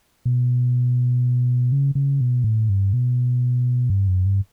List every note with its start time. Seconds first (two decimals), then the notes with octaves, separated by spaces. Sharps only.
0.25 B2
1.72 C#3
1.95 C#3
2.20 B2
2.44 A2
2.69 G2
2.93 B2
3.90 G2
4.08 F#2
4.26 G2